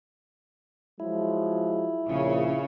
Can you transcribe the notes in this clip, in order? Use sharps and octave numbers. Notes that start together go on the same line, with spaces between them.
F3 F#3 G#3 E4
A#1 C#3 C#5